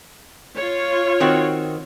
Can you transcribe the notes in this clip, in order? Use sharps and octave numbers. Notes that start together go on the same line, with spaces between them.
F4 C#5
D#3 C4 F#4